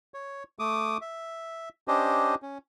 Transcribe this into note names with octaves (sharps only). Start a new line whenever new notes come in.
C#5
A3 D6 D#6
E5
C#4 D4 G4 C5 D#5
C#4